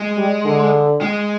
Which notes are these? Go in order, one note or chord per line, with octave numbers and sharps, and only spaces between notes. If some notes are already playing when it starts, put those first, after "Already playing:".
Already playing: G#3
G3
D3
G#3